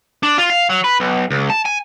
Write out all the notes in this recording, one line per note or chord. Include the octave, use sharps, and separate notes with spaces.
D4
F4
F5
F#3
B4
B1
C#2
A5
G#5